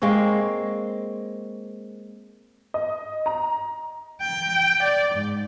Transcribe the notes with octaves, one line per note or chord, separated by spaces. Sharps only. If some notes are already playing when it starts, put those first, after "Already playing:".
G#3 A#3 C4 C#5
D#5
A#5
G5
D5
G#2